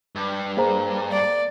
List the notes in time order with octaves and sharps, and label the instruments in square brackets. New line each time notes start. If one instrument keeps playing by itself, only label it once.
[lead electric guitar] G2
[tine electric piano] A#3 [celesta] G#4 C5 A#5
[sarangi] D5